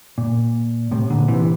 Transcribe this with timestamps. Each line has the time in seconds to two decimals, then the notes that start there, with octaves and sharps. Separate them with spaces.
0.18 A#2
0.91 A2 C3
1.10 A#2 D3
1.28 C3 E3